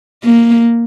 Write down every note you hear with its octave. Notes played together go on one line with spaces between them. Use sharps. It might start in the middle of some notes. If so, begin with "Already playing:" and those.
A#3